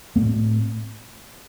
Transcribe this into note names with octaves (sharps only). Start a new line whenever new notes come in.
A2 A3 C4